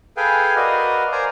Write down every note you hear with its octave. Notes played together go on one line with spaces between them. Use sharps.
G#4 A4 B4 F5 G5 G#5
F#4 A#4 B4 D5 D#5 F5
A#4 C5 D5 G#5 A#5